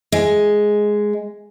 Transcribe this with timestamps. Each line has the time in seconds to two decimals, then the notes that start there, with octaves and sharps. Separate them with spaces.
0.12 G#3